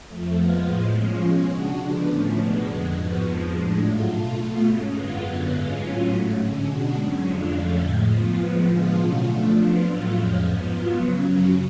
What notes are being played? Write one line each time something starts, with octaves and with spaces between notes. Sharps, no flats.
F2 F3 A3
F3 G#3 B3 F4
A2 F3 G#3
F3 G#3 C#4 F4
B2 G#3 C#4
C#3 G#3 D4 F#4
D3 F3 B3 D4
A2 F3 A3 C#4
B2 G#3 B3 D4
F2 D3 G#3
G#2 F3 B3 F#4
F2 F3 G#3
A2 G#3 D4
G#2 F#3 A3 F4
B2 A3 F4
B2 A3 F4
G#2 G#3 C#4
F#2 D3 G#3 B3 F4
F#2 D3 F#3 B3
G#2 G#3 C#4 F4
A2 F#3 C#4 F4
G#2 F#3 A3
D3 G#3 C#4
B2 G#3 D4 F#4
G#2 F#3 C#4
F2 D3 G#3 D4 F4
F2 D3 F3 A3 C#4
A2 F3 G#3
F#2 F3 B3 F4
A2 F3 G#3 B3
D3 F3 G#3 B3 F4
B2 F#3 A3 C#4 F4
F3 A3 D4
F3 B3 D4 F4
A2 F#3 A3 F4
F2 F3 G#3 C#4
G#2 F3 B3
G#2 F#3 B3 F4
C#3 F#3 C#4
F#2 C#3 F#3 C#4